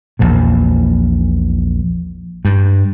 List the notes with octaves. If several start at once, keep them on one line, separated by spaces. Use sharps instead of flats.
A#1 E2 A#2
G2